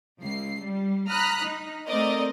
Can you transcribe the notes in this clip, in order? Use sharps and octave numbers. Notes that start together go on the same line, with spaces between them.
C#2 C7
G3
A#5 B5 D#6 F6 F#6 B6
D#4
A3 C4 A#4 D5 D#5